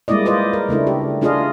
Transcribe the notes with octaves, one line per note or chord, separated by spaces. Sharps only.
G3 G#3 A#3 E4 D5 D#5
F4 B4 C5 D5 D#5
A#4
C#3 A3 D4 E4
G4
A3 D4 F4 G#4 D#5 F5